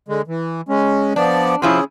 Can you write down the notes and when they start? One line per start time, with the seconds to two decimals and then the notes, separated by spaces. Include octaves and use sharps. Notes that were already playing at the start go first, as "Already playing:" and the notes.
0.08 D3 G#3
0.28 E3
0.69 G#3 C#4
1.16 F3 B3 D4 D5
1.62 C3 F3 C#4 E4 G#4